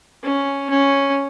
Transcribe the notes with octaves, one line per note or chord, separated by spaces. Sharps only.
C#4
C#4